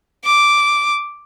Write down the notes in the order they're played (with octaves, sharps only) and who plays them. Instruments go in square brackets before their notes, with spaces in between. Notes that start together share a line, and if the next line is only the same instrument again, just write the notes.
[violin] D6